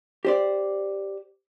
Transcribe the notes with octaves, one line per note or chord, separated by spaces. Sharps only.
G4 C5 D5